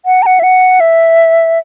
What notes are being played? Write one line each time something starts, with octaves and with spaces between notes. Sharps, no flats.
F#5
A#5
F#5
E5
F#5
E5